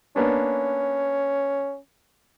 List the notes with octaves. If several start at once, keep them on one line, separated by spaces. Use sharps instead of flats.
A#3 B3 C#4 D4